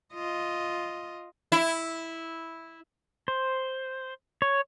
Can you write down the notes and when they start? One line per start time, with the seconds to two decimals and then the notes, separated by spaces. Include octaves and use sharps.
0.14 F4 D#5
1.52 E4
3.28 C5
4.42 C#5